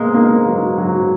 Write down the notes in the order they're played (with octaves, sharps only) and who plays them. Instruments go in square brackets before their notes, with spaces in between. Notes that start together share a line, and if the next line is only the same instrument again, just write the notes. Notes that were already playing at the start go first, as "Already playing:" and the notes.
Already playing: [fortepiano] B2 A#3 [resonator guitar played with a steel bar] G#3
[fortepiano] A#3
F#3
F#3